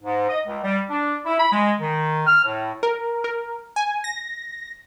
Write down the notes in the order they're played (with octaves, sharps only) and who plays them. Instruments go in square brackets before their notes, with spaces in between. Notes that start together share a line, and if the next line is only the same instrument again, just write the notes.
[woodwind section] G#2
D#5
C#2
G3
D4
E4
B5
G#3
D#3
F6
A2
[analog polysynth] A#4
A#4
G#5
A#6